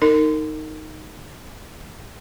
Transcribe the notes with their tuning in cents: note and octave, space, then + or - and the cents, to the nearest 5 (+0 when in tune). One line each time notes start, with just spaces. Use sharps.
D#4 +0 A#4 -35